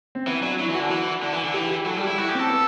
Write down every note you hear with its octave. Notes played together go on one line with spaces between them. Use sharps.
C4
E3 B3
F#3 D4
F#3 E4
E3
F#4
D3
E3
D3
E3
D3
E3 G4
G4
F#3 A4
G3 A4
G4
E4
E4 F#4
G4
C4 A4
B3